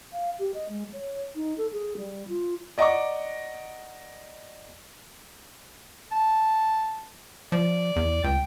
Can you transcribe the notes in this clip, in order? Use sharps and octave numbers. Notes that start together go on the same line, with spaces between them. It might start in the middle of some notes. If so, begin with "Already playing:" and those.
F5
G4
D#5
G#3
C#5
D#4
A4
G#4
G3
F4
D5 D#5 F#5 A#5 C#6 D6
A5
F3 D5
E2
C#2 G5